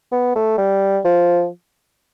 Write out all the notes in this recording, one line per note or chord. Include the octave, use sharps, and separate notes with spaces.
B3
A3
G3
F3